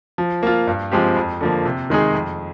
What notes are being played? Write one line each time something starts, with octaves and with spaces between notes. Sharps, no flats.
F3
A#3 F4
G2
F3 G#3 C4 G4
F2
D3 F3 A#3
C3
D#3 G#3 D#4 G#4
F2